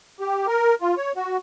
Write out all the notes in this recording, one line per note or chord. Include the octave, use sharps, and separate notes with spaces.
G4
A#4
F4
C#5
F#4